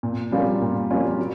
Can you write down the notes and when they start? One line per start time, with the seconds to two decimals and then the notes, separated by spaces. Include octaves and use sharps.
0.03 A#2
0.32 G3 A#3 C#4 F4
0.62 A#2
0.90 G3 A#3 C#4 F4
1.19 F#3